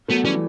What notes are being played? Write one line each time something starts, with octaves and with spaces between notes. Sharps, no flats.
F#3 A3 B3
E3 G3 C#4